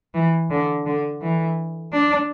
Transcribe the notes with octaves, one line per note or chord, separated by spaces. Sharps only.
E3
D3
D3
E3
D4